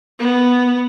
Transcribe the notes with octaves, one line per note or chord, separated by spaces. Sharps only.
B3